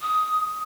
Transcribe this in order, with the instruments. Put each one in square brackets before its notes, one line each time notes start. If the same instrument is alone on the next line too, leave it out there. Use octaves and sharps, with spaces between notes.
[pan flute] D#6